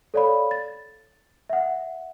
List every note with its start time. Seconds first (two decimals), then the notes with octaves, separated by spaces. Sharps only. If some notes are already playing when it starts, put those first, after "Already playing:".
0.14 A4 C#5 D5 F5 B5
0.51 A6
1.50 E5 F#5